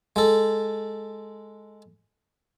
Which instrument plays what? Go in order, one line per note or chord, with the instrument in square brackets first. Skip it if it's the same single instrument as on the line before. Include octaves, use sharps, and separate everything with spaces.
[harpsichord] G#3 A4